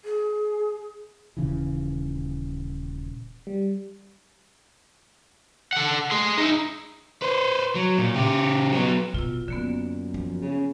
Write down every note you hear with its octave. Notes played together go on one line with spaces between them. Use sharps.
G#4
D#1 C#3 E3
G3
A4 F#5
G#4 C6
D#4 E4
B4 C5
F#3
A#2
C#3 G4
F#3 B3
B2 F4 E6
F#2 D3 F#3 A#3 B3
F3
C#3